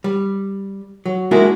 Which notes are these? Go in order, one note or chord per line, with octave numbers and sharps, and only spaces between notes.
G3
F#3
G#3 A#3 D4 E4 F#4 G#4